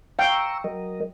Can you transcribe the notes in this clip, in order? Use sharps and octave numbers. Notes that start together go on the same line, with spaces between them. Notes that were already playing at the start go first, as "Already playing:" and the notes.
F5 G5 A#5 C#6 E6
F#3 A#4 D#5